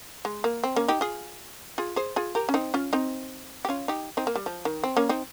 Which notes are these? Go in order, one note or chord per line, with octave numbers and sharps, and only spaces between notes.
G#3
A#3
C4
A#3 C#4
D#4 G4
F4 G#4
F4 G#4
G#4 C5
F4 G#4
G4 A#4
C#4
C4 D#4
C#4 F4
C4 D#4
G4
C#4 F4
D#4 G4
C4 D#4
A#3
G3
F3
D#3
C4
A#3 C#4
C4 D#4